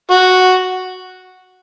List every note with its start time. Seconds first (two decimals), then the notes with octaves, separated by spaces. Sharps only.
0.11 F#4